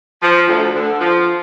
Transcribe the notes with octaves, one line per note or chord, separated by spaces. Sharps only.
F3
D2
D3
F3